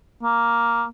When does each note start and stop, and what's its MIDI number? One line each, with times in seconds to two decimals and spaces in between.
0.23 0.84 58